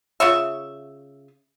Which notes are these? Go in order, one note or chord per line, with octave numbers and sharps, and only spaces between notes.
C#3 F4 C#5 E5